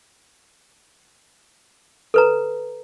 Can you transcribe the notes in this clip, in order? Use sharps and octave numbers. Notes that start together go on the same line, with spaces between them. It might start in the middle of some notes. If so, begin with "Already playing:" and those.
A4 B4 A#5